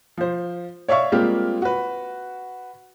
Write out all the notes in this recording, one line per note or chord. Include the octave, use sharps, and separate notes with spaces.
F3 C5
C#5 D5 E5 F5 C#6
G3 G#3 A#3 C4 F4 G4
F#4 B4